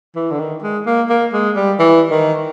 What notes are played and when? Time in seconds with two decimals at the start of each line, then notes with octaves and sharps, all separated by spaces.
0.16 E3
0.31 D3
0.39 D#3
0.62 G#3
0.86 A#3
1.10 A#3
1.33 G#3
1.56 G3
1.79 E3
2.11 D#3